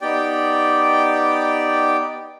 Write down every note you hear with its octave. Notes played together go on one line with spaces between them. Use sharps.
B3 D#4 G4 D5 G5